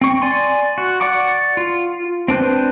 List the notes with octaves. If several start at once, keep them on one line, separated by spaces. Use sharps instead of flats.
C4 C#6
D5 G#5 C6
F#4
D5 F#5 C#6 D6
F4
C4 D4 B4 C5